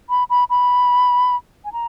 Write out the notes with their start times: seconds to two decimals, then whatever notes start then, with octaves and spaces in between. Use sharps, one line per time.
0.10 B5
0.30 B5
0.50 B5
1.65 G#5
1.73 A#5